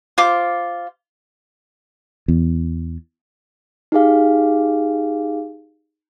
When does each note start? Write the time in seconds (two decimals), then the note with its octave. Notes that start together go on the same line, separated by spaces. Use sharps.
0.18 F4 C5 D6
2.28 E2
3.92 D#4 G4 G#4 F5